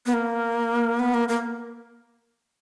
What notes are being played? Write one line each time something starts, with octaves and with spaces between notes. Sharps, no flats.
B3
A#3
B3
A#3
A#3